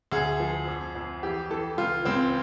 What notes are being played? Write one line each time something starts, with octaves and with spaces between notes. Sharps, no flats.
D2 G#4
F3
F2
F2
E3 G4
E3 A4
C#2 F4
C#2 C4